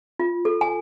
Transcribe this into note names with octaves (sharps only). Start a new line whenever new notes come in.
F4
A4
G#5